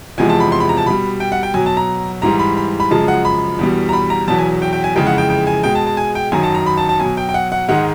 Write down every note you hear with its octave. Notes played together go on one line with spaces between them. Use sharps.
E2 C3 F3 G#3 G#5
A5
B5
C6
B5
A#5
A5
B2 G3 B5
G5
F#5
G5
B2 F#3 G#5
A5
A#5
G#2 E3 G3 A#5
B5
B5
B5
F#2 C#3 F3 G#3 A5
F#5
B5
E2 B2 G3
A#5
B5
A#5
E2 B2 F#3 A5
G#5
G5
G5
G#5
F2 C#3 E3 G#3 G5
F#5
G5
G5
G#5
B2 G#3 G5
A5
A5
G#5
G5
F#2 D#3 F#3 G#5
A5
A#5
B5
A5
A5
B2 F#3 G#5
G5
G5
F#5
F#5
G#2 D#3 G#3 F#5